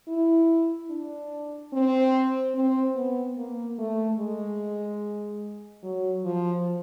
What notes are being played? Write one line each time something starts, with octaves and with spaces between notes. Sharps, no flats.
E4
D4
C4
C4
B3
A#3
A3
G#3
F#3
F3